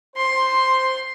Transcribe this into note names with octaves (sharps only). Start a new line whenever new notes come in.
C5 C6